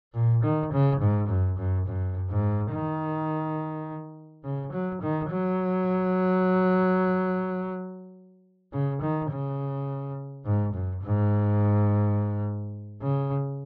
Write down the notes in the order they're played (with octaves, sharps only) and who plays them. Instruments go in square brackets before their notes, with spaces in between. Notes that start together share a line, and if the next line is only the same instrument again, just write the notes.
[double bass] A#2
D#3
C#3
G#2
F#2
F#2
F#2
G#2
D#3
C#3
F#3
D#3
F#3
C#3
D#3
C#3
G#2
F#2
G#2
C#3